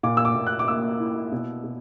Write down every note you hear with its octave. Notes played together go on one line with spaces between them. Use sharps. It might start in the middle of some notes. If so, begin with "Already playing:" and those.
A#2 D6
E6
D6
A#2
F#6
D6
A#3 E6
E4
B2
B2